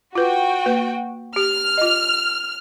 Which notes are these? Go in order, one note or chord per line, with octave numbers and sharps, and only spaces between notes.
F4 F#4 B4 G5
A#3 B4
G4 F6
F4 D#5